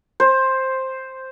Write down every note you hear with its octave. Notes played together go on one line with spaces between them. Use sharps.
C5